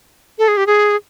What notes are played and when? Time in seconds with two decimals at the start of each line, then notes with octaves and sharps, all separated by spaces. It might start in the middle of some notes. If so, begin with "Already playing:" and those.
0.39 A4
0.48 G#4
0.57 G4
0.67 G#4